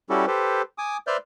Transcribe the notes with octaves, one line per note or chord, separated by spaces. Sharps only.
G3 C#4 E4 F#4 G4 A4
G4 A4 B4 C5
G#5 D6 D#6
B4 C5 D5 E5 F6 G6